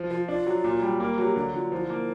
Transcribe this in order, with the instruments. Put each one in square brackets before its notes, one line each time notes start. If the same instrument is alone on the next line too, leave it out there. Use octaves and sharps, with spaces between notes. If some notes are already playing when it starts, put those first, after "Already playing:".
Already playing: [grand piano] F3
[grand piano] F3 [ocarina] F4
[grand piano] D4 [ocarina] F4
[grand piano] F#3
A#2
G3
A#3
[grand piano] F#3 [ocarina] G4
[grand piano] D3 [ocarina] F#4
[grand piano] D3 [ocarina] F4
[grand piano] F3 [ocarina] E4
[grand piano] A#3